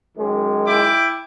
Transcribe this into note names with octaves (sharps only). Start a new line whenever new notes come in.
F#2 D#3 G#3
E4 G5 D6